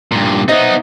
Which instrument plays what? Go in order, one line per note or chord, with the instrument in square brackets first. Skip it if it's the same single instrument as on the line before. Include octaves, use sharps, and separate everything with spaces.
[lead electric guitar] G2 A#2
[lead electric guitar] B3 D#4 [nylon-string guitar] C5 D#5 E5